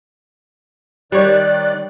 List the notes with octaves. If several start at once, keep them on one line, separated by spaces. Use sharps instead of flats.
D#3 G3 C#5 D5 F#6